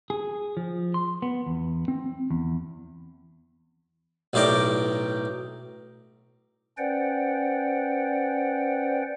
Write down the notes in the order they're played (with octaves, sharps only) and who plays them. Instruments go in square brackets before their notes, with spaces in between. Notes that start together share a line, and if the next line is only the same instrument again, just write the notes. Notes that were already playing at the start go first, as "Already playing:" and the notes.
[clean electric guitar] G#4
F3
C6
B3
E2
C4
E2
[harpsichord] B1 A2 G4 A#4 D5 G5
[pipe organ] C#4 B4 C5 D5 F#5 G5